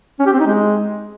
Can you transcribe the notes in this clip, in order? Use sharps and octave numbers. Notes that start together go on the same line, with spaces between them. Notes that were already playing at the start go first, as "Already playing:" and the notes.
C#4
G4
C4
D#4
G#3